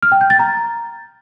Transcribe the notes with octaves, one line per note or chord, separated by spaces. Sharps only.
F6
G5
G6
A6
A#5